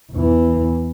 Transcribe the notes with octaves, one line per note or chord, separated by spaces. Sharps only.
E2 E3